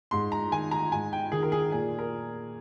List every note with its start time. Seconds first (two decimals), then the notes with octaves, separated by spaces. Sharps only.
0.11 G#2 C6
0.32 A#5
0.52 D#3 G#5
0.71 A#5
0.92 G#2 G#5
1.13 G5
1.32 D#3 G#4
1.43 A#4
1.52 G#4
1.72 A#2 G#4
1.99 A#4